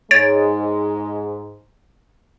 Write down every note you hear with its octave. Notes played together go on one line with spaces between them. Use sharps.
G#2 G#3 C#5 A6 D7